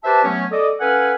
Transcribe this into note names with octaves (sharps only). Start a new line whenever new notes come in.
G4 B4 C5 D5 E5 A5
F#3 A3 B3 C#4
A4 D5 D#5
C#4 A4 B4 F5 F#5 G#5